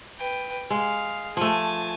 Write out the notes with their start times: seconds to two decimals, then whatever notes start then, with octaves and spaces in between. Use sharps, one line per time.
0.19 B4 G5
0.70 G#3 F5
1.37 F3 A3 G#5 A5